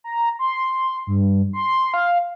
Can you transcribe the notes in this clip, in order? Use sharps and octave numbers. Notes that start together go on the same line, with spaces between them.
A#5
C6
G2
C6
F5